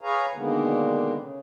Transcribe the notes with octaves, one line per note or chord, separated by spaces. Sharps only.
G#4 B4 C#5 F5 G#5 A#5
B2 D3 D#3 G#3 A#3 B3
C#3